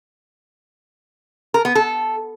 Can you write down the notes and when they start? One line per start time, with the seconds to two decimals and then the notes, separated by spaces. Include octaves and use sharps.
1.54 A#4
1.65 B3
1.75 A4